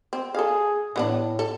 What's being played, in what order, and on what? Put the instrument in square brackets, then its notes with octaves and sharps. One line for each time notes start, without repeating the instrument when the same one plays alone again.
[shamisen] C4
[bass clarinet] G#4 [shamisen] A4 F5
[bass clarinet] A2 [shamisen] E3 B3 D4
[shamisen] A4